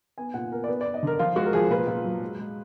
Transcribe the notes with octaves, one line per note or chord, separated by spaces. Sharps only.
B3 G#5
A#2 F#5
B3 A#4
D5
B3 B4
B3 D5
D#5
D3 A#4
F3 F4
G#3 F#4
A#4
F3 G#4
A#2 B4
A#2
F#3
G#3
G#3